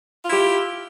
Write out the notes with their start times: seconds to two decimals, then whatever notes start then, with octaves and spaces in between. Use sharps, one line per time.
0.24 F4
0.28 E4
0.32 G4